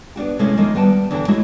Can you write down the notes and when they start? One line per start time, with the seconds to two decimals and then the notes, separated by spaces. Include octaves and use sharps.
0.16 B3 D4 F#4 G4
0.39 C3 G#3 A3 B3 C#4 E4
0.57 D#3 F3 G#3 A#3
0.75 G3 B3 G5 A5
1.11 E2 D3 E3 E4 G5
1.28 F#3 G#3 A3 E4 F#4